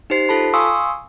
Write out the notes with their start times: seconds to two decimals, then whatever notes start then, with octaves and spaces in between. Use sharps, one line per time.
0.10 D#4 G4 C5 C7
0.29 F4 A4 A5 B5
0.54 F5 G#5 C6 C#6 D#6 E6